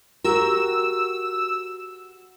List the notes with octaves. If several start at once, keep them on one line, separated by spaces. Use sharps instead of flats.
F#4 G4 A#4 E6